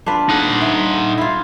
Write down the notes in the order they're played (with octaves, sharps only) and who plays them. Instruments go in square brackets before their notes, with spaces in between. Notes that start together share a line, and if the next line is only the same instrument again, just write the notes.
[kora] D4 F4 B4
[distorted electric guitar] D#4 F#5
[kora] E5
E4 F4